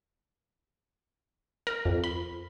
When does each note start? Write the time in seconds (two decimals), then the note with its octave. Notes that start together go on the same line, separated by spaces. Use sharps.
1.67 A#4
1.85 F2
2.04 B5